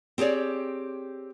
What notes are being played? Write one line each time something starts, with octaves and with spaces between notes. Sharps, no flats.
C4 G4 G#4 C#5 D5